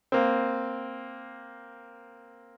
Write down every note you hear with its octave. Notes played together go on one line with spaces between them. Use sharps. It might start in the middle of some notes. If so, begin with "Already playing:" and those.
A#3 C4